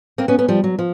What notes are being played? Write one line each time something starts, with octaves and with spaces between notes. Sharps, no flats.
A#3 C4
B3 C#4
B3 C#4
F3 G3
F#3
F3